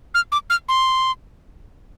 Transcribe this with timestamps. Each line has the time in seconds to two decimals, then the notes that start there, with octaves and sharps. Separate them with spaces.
0.15 F6
0.32 D6
0.50 F6
0.69 C6